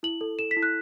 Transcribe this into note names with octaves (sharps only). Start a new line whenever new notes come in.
E4 F#7
A4
A4 E7
B6
E4
F#6